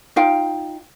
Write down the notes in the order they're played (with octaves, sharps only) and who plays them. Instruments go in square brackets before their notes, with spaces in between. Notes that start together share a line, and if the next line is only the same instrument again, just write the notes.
[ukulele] D#4 F4 F5 G5